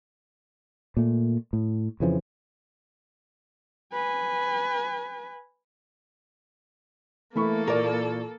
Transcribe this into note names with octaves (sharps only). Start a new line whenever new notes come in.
A#2 A3
A2
F2 C#3 E3 F3
B4 G#5
E3 A3 A#3 A4 B5 C#6
A#2 A#4 D5